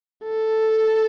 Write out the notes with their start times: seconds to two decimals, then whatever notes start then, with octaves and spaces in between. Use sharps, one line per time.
0.24 A4